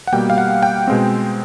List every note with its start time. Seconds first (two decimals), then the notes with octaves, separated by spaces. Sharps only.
0.07 F#5
0.13 B2 G3 A#3 G5
0.30 F5
0.38 F#5
0.63 G5
0.87 B2 G#3 C4